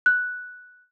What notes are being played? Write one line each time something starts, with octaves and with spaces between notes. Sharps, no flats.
F#6